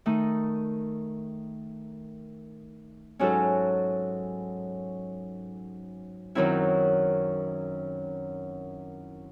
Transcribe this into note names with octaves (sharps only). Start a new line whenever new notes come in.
D#3 A3 D#4
G#2 F#3 C#4 F#4 A4
F#2 D#3 F#3 C4 E4